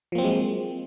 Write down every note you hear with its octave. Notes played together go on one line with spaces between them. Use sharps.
F3 F#3 G#3 A#3 C4